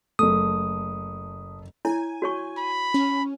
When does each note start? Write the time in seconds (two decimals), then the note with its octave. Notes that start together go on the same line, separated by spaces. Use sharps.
0.19 F#1 A3 D#6
1.85 E4 C#5 G#5
2.22 F#4 C#5 C#6
2.58 B5
2.94 C#4